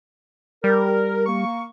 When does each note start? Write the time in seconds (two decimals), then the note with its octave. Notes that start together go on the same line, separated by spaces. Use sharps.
0.64 G3 A#4
1.27 A#3 C#6